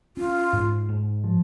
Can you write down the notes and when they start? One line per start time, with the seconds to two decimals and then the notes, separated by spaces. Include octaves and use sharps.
0.17 C#4 F4
0.53 G#2
0.88 G#2
1.24 F3